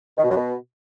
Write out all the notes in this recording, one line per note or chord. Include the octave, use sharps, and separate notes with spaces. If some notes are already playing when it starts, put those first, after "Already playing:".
D#3
B2
F#2
B2